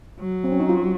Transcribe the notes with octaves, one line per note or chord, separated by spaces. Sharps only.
F#3
C4
C#4
D#4
F4